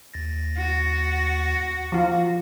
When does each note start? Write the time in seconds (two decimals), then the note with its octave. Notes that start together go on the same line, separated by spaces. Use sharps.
0.14 D#2 A6 A#6
0.57 F#4
1.92 F3 F4